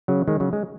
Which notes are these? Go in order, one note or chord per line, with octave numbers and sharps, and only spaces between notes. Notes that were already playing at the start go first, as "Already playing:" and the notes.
C#3 F#3
D#3 G#3
C#3 F#3
G#3